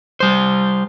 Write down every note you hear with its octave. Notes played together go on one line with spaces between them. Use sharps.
G3 C5